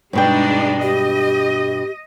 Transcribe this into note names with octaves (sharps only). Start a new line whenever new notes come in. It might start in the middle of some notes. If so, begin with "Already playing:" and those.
G2 B2 G#3 D4 D#4 G5
G4 D#5